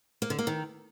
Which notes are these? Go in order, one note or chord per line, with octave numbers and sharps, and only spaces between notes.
A#3
D3
A#3
D#3